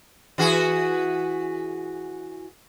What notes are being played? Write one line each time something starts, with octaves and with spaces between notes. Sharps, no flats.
E3 F#4 G#4